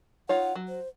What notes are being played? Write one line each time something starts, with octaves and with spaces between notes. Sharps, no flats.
D#4 F4 C#5 F#5
F#3
C5